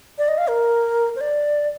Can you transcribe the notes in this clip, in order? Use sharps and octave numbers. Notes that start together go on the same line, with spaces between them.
D5
D#5
F5
A#4
C5
D5